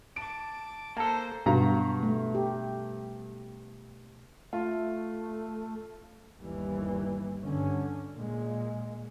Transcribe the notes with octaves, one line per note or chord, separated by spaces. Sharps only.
A5 D6 D7
A#3 A4 C5 A5 A#5
G2 B2 F#4 A#5
A3
G4
A3 F4
G1 D#2 E3 G3
G2 D3 C#4
A#2 G#3